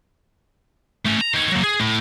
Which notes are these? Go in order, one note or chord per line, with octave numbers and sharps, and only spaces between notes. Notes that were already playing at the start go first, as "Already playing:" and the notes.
A3 C#4
A#5
D#3 C#5
F#3 A#3
G#4
A2